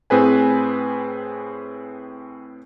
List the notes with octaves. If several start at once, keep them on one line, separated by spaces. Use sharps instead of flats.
A2 C4 G#4 B4 G#5